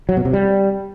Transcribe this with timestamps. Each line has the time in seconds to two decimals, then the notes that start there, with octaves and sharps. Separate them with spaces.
0.09 F#3
0.17 B2
0.25 C3
0.33 G3